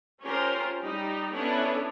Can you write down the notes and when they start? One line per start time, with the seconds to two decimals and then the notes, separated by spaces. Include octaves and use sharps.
0.24 C#4 F4 G4 A#4 C5
0.78 G3 D#4 G4
1.32 B3 C#4 D4 E4 A4 C#5